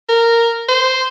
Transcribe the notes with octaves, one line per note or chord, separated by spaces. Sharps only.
A#4
C5